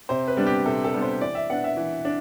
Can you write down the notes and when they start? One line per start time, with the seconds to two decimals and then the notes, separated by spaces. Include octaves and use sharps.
0.09 C3 C5
0.28 B4
0.37 G3 B3 D4
0.47 G4
0.65 C3 A4
0.84 A4
0.94 G3 B3 D4
1.02 C5
1.21 E3 D5
1.35 E5
1.50 B3 D4 F#5
1.64 E5
1.77 E3
2.05 D4